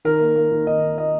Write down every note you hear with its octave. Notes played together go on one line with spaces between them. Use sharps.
D#3 A#4
A#3
A#3
D#3
D#3 D#5
A#3
A#3 D#5